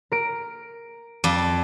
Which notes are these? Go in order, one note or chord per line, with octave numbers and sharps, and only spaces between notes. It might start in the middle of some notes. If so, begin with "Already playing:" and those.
A#4 D7
F2 D5